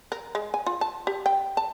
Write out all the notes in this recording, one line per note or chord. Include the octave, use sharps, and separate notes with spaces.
A#4
G#3
G#5
F4
A5
G4
G5
A5